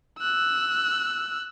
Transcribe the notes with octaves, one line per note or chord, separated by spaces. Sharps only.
E6 F#6